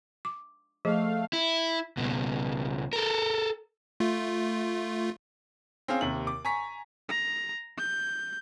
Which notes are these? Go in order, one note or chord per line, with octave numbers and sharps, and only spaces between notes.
D6
F3 A3 G#4 D#5 F5
E4
C#2 B2
A4 A#4
A3 F4
C4 C#4 G#4 F5
D#2 C3 F#7
D6
G#5 A#5 C#6 B6
A#5
G6